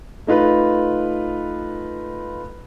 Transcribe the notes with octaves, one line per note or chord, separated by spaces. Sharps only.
A3 D#4 F4 B4